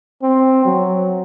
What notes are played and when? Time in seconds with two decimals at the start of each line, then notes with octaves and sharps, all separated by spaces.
0.23 C4
0.65 F#3